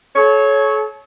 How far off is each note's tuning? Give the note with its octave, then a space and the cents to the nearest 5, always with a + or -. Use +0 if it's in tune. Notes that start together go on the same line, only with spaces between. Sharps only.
A4 -40 C#5 +0